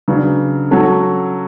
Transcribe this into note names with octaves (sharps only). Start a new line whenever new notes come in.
C#3 F#3 B3 D4
F#3 C#4 F#4 A4